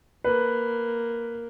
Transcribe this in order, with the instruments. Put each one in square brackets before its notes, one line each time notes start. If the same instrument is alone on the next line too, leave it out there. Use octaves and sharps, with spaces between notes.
[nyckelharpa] A#3 [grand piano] B4